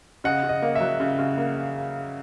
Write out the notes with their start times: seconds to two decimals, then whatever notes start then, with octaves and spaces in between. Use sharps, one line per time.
0.24 C#3 D#5 F#5
0.43 C#3
0.49 D#5
0.62 A#3
0.75 E5
0.81 F#3
1.00 C#3
1.19 C#3
1.38 A#3